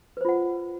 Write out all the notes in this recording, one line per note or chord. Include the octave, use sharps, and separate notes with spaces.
F4 B4 C5 F#5